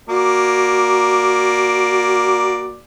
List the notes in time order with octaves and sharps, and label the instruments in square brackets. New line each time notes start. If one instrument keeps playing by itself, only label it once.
[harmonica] A#3 D5 [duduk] F#4